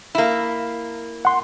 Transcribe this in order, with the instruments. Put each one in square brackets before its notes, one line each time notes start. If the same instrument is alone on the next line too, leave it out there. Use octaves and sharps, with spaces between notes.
[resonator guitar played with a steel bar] A#3 E4
[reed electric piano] F#5 C6